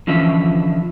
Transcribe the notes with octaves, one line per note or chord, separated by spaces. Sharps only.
D3 E3 F3 C#4 E5